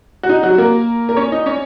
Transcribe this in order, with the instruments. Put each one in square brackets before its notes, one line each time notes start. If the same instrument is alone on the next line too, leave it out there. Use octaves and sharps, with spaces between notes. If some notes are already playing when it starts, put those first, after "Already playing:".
[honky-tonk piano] F#4
D#4
F#3 F#4
A#3 A#4
A#4
C#4 C#5
D#4 D#5
C#4 C#5